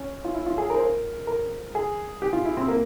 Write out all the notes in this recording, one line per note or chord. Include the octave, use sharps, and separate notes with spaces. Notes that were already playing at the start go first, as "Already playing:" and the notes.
Already playing: C#4
F4
E4
F4
G#4
A#4
C5
A#4
A#4
G#4
G4
F4
E4
C4
A#3